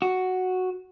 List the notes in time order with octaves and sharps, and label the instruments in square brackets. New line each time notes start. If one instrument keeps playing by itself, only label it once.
[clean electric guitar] F#4